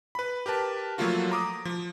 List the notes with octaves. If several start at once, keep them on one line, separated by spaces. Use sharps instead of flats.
B4 B5
G4 A#4 B4 A5
F3 F#3 A3 A#3 F4 F#4
A#5 D6 D#6
F3